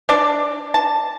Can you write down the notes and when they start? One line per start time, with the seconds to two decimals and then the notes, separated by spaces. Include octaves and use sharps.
0.09 D4 D5
0.74 A5